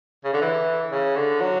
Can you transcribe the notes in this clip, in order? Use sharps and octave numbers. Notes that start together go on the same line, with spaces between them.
C#3
D3
E3
C#3
D3
F#3